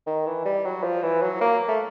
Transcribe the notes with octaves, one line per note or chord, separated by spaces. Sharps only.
D#3
E3
G3
F#3
F3
E3
F#3
A#3
A3